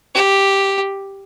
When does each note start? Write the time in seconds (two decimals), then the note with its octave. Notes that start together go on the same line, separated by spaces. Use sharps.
0.14 G4